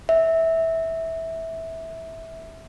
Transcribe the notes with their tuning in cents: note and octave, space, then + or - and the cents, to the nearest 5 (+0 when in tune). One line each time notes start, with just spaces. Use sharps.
E5 -15